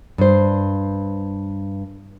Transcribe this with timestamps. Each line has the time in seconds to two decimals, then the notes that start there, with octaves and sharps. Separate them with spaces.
0.18 G2 C5